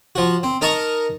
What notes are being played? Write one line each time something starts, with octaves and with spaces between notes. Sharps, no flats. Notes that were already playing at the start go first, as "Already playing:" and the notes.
F3 F#4
C4
D#4 A#4 D#5 A5 A#5 C#6